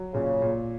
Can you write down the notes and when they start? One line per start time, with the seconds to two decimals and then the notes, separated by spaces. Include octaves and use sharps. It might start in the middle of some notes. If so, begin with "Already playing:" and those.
Already playing: F#3
0.14 A#2 C#3
0.42 A#2